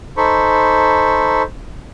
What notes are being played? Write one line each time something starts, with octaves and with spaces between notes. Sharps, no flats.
D#4 A4 C5 B5 C#6